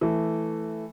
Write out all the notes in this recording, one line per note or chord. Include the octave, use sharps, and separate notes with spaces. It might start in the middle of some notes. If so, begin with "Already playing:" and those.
E3 A3